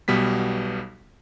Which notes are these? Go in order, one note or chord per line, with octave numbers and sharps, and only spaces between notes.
B1 B2 G3 B3 B6